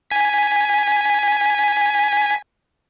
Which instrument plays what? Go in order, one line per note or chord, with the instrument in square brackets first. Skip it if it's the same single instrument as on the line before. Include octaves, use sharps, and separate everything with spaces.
[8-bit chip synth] G#5 B6